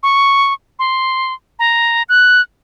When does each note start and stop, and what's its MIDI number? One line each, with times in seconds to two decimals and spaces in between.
0.03 0.53 85
0.79 1.33 84
1.59 2.03 82
2.09 2.41 90